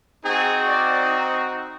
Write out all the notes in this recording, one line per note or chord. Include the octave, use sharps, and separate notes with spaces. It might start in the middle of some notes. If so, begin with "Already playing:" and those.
C4 D#4 F#4 G#4
D5